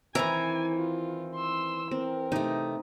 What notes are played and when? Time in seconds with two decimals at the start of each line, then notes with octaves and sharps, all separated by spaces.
0.15 D#3 E3 C4 G#5 A#5
0.76 F4
1.35 C6 E6
1.91 C4 A#4
2.32 C3 A3 D#4